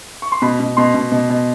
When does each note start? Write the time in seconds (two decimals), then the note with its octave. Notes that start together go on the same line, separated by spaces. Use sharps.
0.22 C#6
0.32 C6
0.42 B2 B5
0.60 B2
0.77 B2 C6
0.94 B2
1.12 B2
1.30 B2